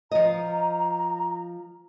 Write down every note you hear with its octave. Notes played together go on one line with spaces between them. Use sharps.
F3 D#5 A#5